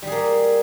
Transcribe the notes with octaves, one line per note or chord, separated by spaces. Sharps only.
G3 A#3 G#4